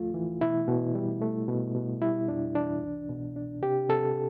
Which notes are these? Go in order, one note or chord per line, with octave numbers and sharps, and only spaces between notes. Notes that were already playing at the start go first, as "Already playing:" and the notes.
Already playing: D2 F3 A3 F4
E3
B2 E4
B2
G3
A3
B2
B2
G3 E4
F2 D4
E3 D4
C2
B2
D4
C3 G4
C3 A4